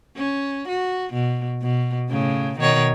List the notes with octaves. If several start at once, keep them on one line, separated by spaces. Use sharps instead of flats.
C#4
F#4
B2
B2
A2 C#3
B2 D#3 C#5